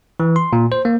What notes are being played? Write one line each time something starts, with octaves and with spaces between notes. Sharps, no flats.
E3
C6
A#2
C5
A#3